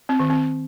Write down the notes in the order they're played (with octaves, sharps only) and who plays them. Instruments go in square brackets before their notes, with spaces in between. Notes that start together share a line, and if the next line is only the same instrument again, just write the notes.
[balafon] C4
D#3
C4